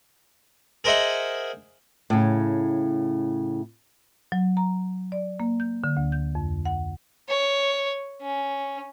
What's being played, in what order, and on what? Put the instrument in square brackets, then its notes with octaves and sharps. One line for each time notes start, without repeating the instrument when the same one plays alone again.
[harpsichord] G#4 A#4 C5 D#5 E5 F#5
[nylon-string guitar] A2 C#3
[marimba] F#3
A#5
D5
A#3
G6
D3
D2
G6
F2
F#5
[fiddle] C#5
C#4